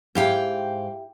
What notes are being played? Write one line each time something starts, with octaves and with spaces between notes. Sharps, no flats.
G#2 E4 G4 F5 G5